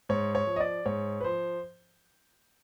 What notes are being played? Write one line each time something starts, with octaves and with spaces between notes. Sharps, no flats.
G#2 C#5
C#5
F3
D#5
D5
G#2 C#5
B4
F3 C5